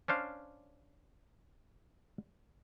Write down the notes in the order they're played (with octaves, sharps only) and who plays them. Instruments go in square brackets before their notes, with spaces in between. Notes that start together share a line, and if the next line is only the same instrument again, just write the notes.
[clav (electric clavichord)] C#4 D4 C5 F5